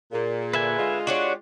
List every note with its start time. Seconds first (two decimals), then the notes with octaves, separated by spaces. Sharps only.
0.12 A#2 G#4
0.53 D3 B4 E5 G#5
0.78 G#3 F4
1.07 D4 F#4 G4 C#5